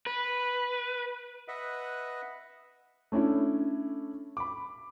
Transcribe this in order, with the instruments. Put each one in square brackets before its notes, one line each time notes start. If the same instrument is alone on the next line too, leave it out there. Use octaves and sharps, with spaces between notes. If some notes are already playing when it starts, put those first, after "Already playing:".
[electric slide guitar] B4
[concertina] B4 D#5 E5 F#5
[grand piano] A3 C#4 D4 E4
B5 D6